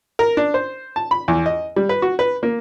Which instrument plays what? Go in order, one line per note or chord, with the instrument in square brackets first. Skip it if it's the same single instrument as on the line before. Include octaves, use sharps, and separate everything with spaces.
[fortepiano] A#4
D4
C5
A5
B5
E2
D#5
G3
B4
F#4
B4
A#3